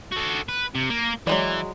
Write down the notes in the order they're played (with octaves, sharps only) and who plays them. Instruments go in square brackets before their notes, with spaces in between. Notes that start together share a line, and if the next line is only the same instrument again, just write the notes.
[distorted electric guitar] F#4 A4
B4
C3
A#3
[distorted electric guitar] E3 [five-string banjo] F#3 G#3 D5